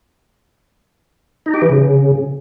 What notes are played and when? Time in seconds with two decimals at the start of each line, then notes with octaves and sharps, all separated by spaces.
1.46 D#4
1.54 G4
1.62 E3
1.70 C#3